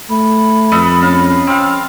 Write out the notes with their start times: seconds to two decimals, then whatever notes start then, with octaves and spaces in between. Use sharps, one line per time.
0.10 A3 B5
0.72 F2 A4 B4 D#5
1.02 C#4 F5
1.47 C4 F5